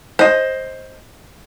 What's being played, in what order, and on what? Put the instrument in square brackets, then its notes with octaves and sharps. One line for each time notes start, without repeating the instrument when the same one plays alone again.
[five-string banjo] C5 D#5